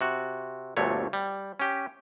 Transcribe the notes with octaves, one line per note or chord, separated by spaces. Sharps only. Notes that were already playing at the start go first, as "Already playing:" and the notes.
C3 F#4
G1 D2 A#2 A3 C#5
G3
C#4 G4